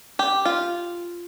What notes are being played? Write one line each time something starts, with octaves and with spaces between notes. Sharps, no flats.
G4
F4